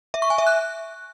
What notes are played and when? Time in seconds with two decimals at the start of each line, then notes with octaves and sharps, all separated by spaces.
0.14 E5
0.22 C#6
0.30 G#5
0.38 E5
0.47 F#6